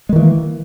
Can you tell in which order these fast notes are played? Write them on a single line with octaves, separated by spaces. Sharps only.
G#3 D#3 E3 A#3